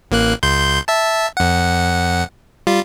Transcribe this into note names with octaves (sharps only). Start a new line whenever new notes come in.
A1 A#3 F#6
C#2 C6 G6
E5 A5
F2 F#5
G3 F4